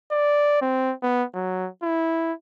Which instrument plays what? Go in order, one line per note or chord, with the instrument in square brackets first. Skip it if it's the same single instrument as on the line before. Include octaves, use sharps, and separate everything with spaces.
[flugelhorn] D5
C4
B3
F#3
E4